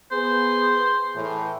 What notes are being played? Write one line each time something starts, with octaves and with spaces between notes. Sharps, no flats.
B3 G#4 C5
A2 E3